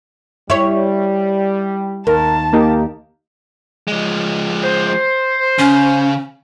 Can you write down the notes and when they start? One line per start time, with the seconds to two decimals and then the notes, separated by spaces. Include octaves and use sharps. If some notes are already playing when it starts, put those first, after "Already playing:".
0.50 G3 E4 C#5
2.07 D#2 A#4 A5
2.53 A#3 D#4 G4
3.88 F3 G#3
4.64 C5
5.59 C#3 C#4